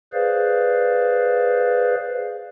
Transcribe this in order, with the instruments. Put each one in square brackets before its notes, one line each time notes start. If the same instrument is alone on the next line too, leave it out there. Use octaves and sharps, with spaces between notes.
[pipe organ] G#4 B4 C5 D5 F5